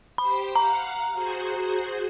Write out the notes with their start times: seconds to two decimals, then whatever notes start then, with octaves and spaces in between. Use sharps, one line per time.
0.18 G4 C5 B5
0.56 F5 F#5 A#5
1.13 F#4 G#4 C5